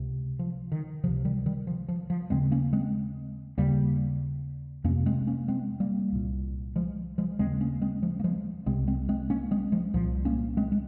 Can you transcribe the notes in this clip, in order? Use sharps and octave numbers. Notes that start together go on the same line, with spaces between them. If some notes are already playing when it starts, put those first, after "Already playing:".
Already playing: C#2 C3
F3
D#3
C#2 C3 F3
D#3 G3
D#3 G3
F3
F3
F3
D#2 C#3 G#3 C4
A#3 C#4
G#3 C4
D#2 C#3 G3 A#3
F2 C3 A#3 C#4
G#3 C4
A#3 C#4
G#3 C4
G3 A#3
C2 A#2
F3 G#3
F3 G#3
D#2 C#3 G#3 C4
A#3 C#4
G#3 C4
F3 G#3
A#3
F3 G#3
C2 C3 G#3 C4
G#3 C4
G#3 C4
A#3 C#4
G#3 C4
F3 G#3
C2 A#2 F3
A#3 C#4
G#3 C4
G#3